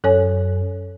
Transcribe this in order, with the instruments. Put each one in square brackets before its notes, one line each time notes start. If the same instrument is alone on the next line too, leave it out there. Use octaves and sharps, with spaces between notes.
[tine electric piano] F#2 [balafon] A4 C#5 G#5